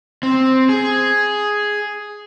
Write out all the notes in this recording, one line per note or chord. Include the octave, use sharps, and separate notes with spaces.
C4
G#4